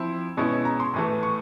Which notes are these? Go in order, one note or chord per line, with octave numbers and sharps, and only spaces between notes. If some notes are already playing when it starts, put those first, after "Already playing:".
Already playing: F3 C4 E4
B2 G#3 C#4 E4
A#5
C6
A2 E3 A3
C#6